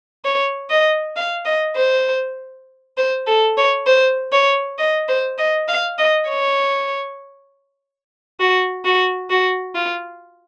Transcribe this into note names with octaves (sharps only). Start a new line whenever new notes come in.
C#5
D#5
F5
D#5
C5
C5
A4
C#5
C5
C#5
D#5
C5
D#5
F5
D#5
C#5
F#4
F#4
F#4
F4